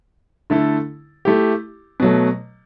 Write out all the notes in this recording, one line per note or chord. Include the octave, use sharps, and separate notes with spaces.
D3 A3 E4 A4
A3 E4 G4
B2 F#3 A3